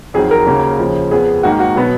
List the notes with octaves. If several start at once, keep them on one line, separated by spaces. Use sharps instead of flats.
F2 D#3 F#3 G#4
A#4
D#2 C#3 F#3 A#3
D#2 C#3 F3
F2 F3 B3 G#4
G#2 D#3 A#3 F#4
F#4
B2 F#3 B3